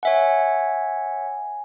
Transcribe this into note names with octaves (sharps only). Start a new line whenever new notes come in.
C#5 E5 F#5 G#5